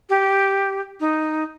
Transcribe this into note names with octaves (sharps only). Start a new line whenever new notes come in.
G4
D#4